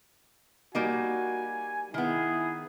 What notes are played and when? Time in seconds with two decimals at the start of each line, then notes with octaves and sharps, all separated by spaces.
0.75 G3 A#3 D#4 F#4 G#5
1.94 D#3 B3 E4 G#4